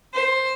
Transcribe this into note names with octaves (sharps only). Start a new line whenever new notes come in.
C5